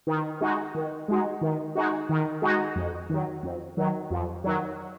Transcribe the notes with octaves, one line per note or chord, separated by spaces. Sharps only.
D#3
G#3 D#4 F#4
D#3
G#3 D#4 F#4
D#3
G#3 D#4 F#4
D#3
G#3 D#4 F#4
F2
D#3 F#3
F2
D#3 F#3
F2
D#3 F#3